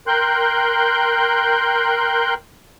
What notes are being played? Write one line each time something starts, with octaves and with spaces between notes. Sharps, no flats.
A#4 G5 C6 F#6 G6